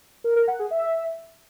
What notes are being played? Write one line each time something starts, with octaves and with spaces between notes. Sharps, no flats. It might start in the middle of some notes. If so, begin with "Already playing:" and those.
A#4
A#4
F#5
G#4
E5